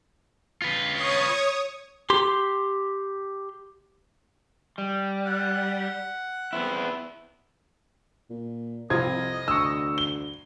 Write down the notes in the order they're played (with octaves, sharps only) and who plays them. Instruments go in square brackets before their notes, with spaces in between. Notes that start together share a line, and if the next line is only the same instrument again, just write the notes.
[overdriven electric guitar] F4 B4
[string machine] C#5 C#6 D#6
[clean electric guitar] G4 C6
[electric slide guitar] G3
[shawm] F#5
[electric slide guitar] B3 C4 E4
[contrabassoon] A#2
[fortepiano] C2 C4 F4 [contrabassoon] F2 [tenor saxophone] D#5 [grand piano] G#6
[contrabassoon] D2 [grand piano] C#6 E6
[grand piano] G7